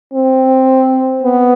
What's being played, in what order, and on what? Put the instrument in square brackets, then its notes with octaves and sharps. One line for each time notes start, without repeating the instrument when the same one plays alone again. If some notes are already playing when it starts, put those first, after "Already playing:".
[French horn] C4
B3